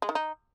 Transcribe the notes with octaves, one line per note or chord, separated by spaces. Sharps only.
G#3
D#3
D#4